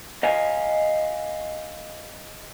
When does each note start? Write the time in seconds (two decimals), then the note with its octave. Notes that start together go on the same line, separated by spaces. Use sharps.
0.23 D#5 F5 G#5